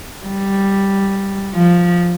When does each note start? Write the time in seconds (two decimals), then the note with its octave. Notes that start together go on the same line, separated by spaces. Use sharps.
0.26 G3
1.55 F3